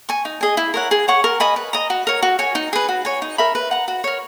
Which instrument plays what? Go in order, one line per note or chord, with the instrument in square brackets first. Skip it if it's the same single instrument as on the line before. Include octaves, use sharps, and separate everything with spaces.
[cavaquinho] G#5 C#6
D#4
G#4 D#5 G#5
E4
A#4 C#5 F#5
G#4
C#5 F#5 C#6
A#4
D#5 G#5 B5
B4
D#5 A#5
F#4
A#4 C#5
F#4
C#5 G#5
D#4
G#4 B4
F#4
C#5 G#5
D#4
A#4 E5 B5
B4
F#5 A#5
F#4
A#4 C#5